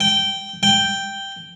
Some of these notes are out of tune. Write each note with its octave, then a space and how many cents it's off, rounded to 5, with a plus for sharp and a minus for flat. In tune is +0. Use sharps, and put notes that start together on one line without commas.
G5 -10
G5 +0